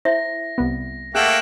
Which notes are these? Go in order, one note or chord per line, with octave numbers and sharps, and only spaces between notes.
E4 C5 E5 A#6
C2 B3
A3 A#3 G#4 F#5 G5 F#6 E7 F#7